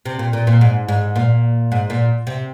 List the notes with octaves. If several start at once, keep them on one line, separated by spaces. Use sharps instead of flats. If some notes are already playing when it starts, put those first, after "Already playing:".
C3
A#2
A#2
A#2
G#2
G#2
A#2
G#2
A#2
C3